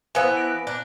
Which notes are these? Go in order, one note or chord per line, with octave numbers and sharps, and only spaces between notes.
E3 B3 C5 F5 G#5
A#6 D7
D4